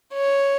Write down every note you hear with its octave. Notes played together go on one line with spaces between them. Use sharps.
C#5